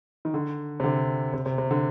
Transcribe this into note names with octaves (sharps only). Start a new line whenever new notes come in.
D#3
D3
C3
D3
C3
C3
C3
D3